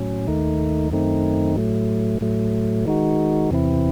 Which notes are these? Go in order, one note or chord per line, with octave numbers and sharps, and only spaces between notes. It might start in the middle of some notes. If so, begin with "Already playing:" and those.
Already playing: A2 F#3 C#4
D#2 D#3 A3 D#4
F#2 D#3 A3 C4 D#4
A2 F#3 A3
A2 F#3 A3
D#3 G#3 D#4 F#4
E2 C3 E3 C4 E4